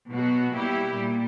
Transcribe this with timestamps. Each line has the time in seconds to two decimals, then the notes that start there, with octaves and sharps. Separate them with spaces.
0.12 B2 F#3 B3 F#4
0.54 G3 A#3 E4 G4
0.96 A#2 G3